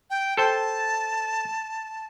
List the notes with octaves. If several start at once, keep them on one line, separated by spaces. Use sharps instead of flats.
G5
A4 C5 G5 A5